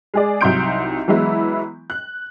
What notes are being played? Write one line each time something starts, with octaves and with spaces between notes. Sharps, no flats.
G#3 G#4 D5
C2 F#3 D#4 C6 G6 D7
E3 F#3 G#3 B3 E4
F#6